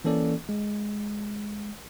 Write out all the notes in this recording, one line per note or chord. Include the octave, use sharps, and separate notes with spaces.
E3 A#3 C#4 A4 D5
G#3